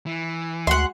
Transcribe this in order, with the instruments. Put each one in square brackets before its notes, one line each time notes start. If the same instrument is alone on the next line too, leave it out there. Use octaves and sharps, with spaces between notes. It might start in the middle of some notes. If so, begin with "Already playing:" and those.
[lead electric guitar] E3
[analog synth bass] D2 [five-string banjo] G#3 F#4 E5 [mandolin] F#5 C6